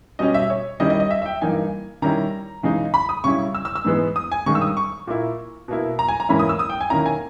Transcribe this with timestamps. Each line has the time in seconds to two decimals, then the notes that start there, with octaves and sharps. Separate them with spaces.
0.19 B2 G3 C#4 D#5
0.34 E5
0.50 C#5
0.80 D#3 G3 C#4 E4 D#5
0.90 D#5
1.00 D#5
1.11 E5
1.22 E5
1.26 G5
1.42 G2 E3 A#3 D#4 G#5
2.02 D#3 G3 C#4 E4 A#5
2.63 C#3 E3 G#3 D#4
2.94 B5
3.09 D#6
3.24 C#3 G3 C#4 E4 C#6
3.55 E6
3.65 E6
3.75 E6
3.85 G#2 E3 G#3 B3
4.16 D#6
4.32 G#5
4.46 G2 D#3 G#3 C#4 C#6
4.55 E6
4.61 D#6
4.77 C#6
5.07 A#2 A#3 E4
5.68 B2 A#3 E4
5.99 A#5
6.08 G#5
6.20 A#5
6.29 G#2 E3 A#3 C#4 E4 B5
6.39 D#6
6.49 E6
6.59 D#6
6.70 G5
6.81 G#5
6.90 D#3 A#3 C#4 E4 A#5
7.06 G#5